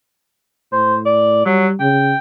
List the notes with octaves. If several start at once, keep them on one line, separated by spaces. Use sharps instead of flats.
A2 C5
D5
F#3 G3
C#3 G5